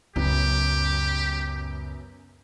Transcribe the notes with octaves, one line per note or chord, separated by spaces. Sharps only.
C#2 F#2 B3 G4